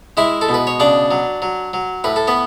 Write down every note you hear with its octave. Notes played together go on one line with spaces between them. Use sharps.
G#3 E4 E5
A4
B2
B4
C#5
C#3 D4 D5
F#3
F#3
F#3
A2 B4
A4
B3 B4